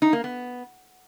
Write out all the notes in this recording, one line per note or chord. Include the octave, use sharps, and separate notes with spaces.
D#4
A#3
B3